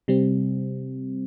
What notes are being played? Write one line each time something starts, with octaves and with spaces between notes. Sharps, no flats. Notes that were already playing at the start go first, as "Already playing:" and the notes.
C3 G3 C4